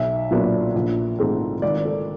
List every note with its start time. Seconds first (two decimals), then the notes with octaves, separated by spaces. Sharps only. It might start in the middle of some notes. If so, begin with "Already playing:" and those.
Already playing: B1 E5
0.31 A#2 F#3 B3 D4
0.75 A#1
1.19 G#2 E3 A3 C4
1.62 G#1 D5
1.85 A4